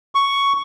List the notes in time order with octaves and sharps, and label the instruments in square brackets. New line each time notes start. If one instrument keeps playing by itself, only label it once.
[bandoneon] C#6